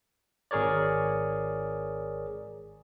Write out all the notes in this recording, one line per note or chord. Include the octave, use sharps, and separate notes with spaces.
G#1 G#4 A#4 C#5 D5